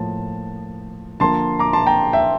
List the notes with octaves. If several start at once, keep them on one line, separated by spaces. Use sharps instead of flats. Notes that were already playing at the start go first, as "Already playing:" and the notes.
Already playing: A2 F3 A#3 A5
D3 F3 A#3 A5 C6
A#5 D6
A5 C6
G5 A#5
E5 G5